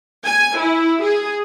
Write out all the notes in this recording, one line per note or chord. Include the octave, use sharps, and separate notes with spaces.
G#5
E4
G#4